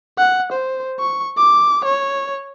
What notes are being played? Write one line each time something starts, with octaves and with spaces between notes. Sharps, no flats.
F#5
C5
C#6
D6
C#5